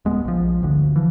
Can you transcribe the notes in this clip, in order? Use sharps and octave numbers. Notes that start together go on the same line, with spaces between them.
D#1 G#3 B3
A#1 F3
G1 D2 D3
E3 F3